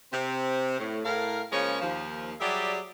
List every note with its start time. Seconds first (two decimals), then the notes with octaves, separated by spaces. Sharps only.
0.13 C3 C4
0.79 A2
1.05 A2 A#4 F5
1.52 C#3 F3 G#3 A#3 C#4 C#5
1.82 D#2 F3
2.40 F#3 G3 G4 G#4 D5 E5